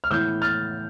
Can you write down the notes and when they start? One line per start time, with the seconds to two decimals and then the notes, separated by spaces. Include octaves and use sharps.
0.04 F6
0.10 A2 E3 B3 E6 G6
0.42 F6 A6